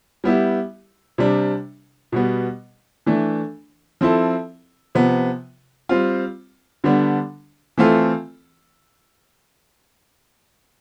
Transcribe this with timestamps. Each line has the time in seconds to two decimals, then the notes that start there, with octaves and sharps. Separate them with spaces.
0.24 G3 B3 E4 G4
1.18 C3 G3 D4
2.12 B2 G3 B3
3.06 E3 A3 D4
4.01 F3 C4 E4 A4
4.95 C3 F3 B3
5.89 G3 C4 F4
6.84 D3 G3 B3 D4
7.78 E3 A3 C4 F4 A4